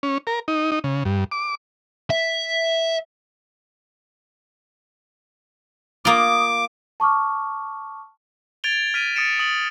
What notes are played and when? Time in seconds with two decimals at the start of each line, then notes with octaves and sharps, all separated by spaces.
0.03 C#4
0.27 A#4
0.48 D#4
0.72 D#4
0.84 C#3
1.05 G2
1.32 D6
2.10 E5
6.05 A#3 F4 D6 D#6
7.00 A5 C#6 D6 F6
8.64 G#6 A6 D7 F7 G7
8.94 F6 B6 D7 D#7
9.15 D#6 A6 C#7 D7 E7
9.39 D#6 A6 F#7